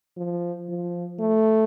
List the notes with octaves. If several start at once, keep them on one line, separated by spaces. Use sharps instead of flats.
F3
F3
A3